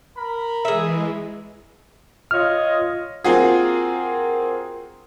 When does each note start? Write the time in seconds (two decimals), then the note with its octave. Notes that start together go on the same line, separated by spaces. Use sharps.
0.18 A#4 B5
0.65 E3 G#3 G#4 E5
2.31 F4 C#5 D#5 F6
3.24 A#3 C4 F4 F#4 G#4